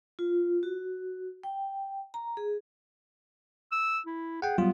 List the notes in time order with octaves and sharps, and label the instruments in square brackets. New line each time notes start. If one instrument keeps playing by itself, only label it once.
[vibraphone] F4
F#4
G5
A#5
G#4
[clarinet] E6
E4
[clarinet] G#4 [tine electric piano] F#5 G5
[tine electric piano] F#3 G3 F4 [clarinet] B3